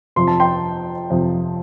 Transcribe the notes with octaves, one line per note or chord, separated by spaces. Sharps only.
F2 C3 F3 C6
A5
G5 C6
F2 C3 F3